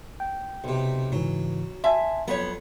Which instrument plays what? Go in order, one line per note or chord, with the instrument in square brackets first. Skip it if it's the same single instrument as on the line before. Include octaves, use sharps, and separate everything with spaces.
[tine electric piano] G5
[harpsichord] B1 C3
[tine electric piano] G#2 C#3 E3 [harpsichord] F#3
[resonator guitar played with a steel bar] E5 [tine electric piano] G#5 A5 C6
[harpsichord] F2 A#5 [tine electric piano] F#3 [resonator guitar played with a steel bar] B3 C#5